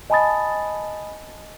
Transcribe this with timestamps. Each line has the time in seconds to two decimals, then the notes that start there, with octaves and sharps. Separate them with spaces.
0.10 D#5 G#5 A5 B5 D#6 A6